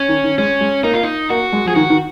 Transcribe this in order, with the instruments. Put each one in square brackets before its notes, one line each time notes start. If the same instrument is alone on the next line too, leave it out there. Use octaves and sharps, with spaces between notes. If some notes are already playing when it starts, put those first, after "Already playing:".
Already playing: [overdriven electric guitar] C#4
[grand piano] D#3
D#3
[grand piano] G#3 [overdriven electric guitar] C#4
[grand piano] G#3
[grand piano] A#3 [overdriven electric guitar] D#4
[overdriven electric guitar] F4
D#4
[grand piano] A#3 [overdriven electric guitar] F#4
[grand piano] G#3
[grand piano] F3 [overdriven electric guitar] G#4
[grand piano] D#3 [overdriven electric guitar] F#4
[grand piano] D#3